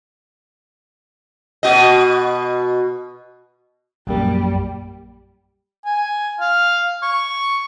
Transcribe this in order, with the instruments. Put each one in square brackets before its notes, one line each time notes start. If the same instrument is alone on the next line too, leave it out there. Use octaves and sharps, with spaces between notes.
[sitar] B2 F#4 D#5
[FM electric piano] A#1 F#2 A#3 [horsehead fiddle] G3
[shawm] G#5
F5
C#6